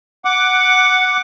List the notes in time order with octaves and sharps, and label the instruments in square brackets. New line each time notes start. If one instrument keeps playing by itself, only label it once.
[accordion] F#5 D6